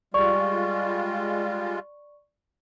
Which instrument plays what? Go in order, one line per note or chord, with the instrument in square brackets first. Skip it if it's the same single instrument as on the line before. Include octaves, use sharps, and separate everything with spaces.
[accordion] G3 G#3 F4 [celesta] D5 C#6